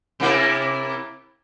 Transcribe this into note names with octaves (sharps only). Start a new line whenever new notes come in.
C3 A#3 E4